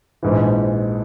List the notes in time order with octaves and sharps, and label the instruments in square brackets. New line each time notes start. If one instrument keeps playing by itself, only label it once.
[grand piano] A#1 G#2 E3